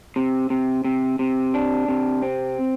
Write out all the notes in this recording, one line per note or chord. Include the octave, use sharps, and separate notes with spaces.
C3
C3
C3
C3
D4
C3
C4